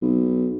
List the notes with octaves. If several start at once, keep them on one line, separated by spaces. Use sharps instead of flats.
B1